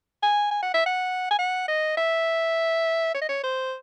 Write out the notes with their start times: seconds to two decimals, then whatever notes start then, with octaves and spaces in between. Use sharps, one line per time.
0.23 G#5
0.51 G#5
0.63 F#5
0.74 E5
0.86 F#5
1.31 G#5
1.39 F#5
1.68 D#5
1.98 E5
3.14 C#5
3.21 D#5
3.29 C#5
3.44 C5